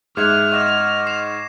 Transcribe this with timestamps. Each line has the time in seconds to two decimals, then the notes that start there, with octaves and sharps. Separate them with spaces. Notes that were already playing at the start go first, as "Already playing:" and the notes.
0.17 G#2 G#4 E5 D6 F6 F#6 G#6
0.52 D#5 F#5 C#6 D#6 A#6 E7
1.06 D6 C7 E7